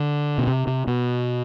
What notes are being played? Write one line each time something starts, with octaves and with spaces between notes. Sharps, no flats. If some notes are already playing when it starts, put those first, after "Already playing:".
Already playing: D3
B2
C3
C3
B2